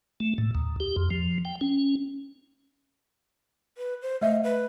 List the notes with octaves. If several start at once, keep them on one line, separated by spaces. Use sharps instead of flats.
A3
A2
D#2
G4
F2
F3
G5
C#4
B4
C5
A3 D#5 E5
B4